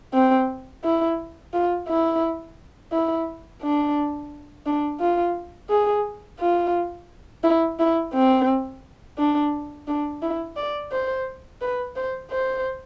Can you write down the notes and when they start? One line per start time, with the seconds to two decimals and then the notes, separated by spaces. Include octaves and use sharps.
0.14 C4
0.84 E4
1.54 F4
1.88 E4
2.92 E4
3.62 D4
4.66 D4
5.01 F4
5.70 G#4
6.39 F4
7.44 E4
7.79 E4
8.14 C4
9.18 D4
9.88 D4
10.22 E4
10.57 D5
10.92 C5
11.61 B4
11.96 C5
12.31 C5